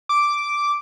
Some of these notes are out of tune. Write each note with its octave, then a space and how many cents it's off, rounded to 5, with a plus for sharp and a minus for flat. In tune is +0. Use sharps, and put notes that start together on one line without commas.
D6 -5